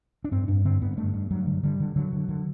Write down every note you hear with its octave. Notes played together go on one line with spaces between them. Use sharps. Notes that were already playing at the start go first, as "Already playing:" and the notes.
D4
G2 C4
G2 D4
D3 C4
G2 B3
G2 A3
G2
G2 F#3
D3
D3 G3
D3
D3 F#3
D3
D3